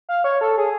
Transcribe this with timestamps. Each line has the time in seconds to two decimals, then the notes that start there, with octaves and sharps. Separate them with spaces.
0.09 F5
0.24 C#5
0.41 A4
0.58 G#4